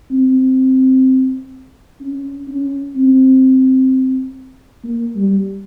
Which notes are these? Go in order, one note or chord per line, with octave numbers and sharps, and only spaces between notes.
C4
C#4
C#4
C4
A#3
G3